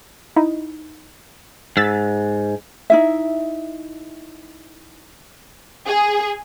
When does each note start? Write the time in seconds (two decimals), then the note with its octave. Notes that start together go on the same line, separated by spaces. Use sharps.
0.36 D#4 E4
1.77 G#2 E6 A6 B6
2.90 D#4 E4 E5
5.87 G#4